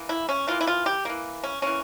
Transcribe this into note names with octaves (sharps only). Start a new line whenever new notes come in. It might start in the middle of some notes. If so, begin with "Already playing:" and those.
Already playing: E3 A#3
E4
C#4
E3 A#3 F4
E4
F4
G4
E3 A#3
C#4
E3 A#3 C#4